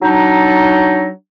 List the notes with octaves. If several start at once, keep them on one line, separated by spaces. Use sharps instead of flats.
F#3 D4 D#4